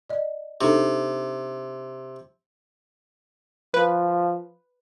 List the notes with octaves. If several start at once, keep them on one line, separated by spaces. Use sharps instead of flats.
D5 D#5
C3 D4 D#4 A4
F3 B4